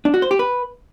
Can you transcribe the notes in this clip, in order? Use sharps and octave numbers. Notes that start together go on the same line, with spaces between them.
D4
F#4
C5
G4
B4